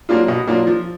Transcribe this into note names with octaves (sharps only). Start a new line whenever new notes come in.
F#3 A#3 D4 F4
B2
F#3 A#3 D4 F4
F3